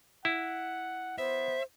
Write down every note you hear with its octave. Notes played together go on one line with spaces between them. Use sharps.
E4 F#5
B3 C5 E5